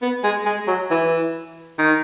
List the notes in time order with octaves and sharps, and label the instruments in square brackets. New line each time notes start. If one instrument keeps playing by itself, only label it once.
[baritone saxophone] B3
G#3
G#3
F#3
E3
D#3